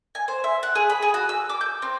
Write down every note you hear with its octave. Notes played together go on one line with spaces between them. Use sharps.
G#5
C5
E5
F#5
G#4
B5
G#4
F#4
E6
D6
G6
C4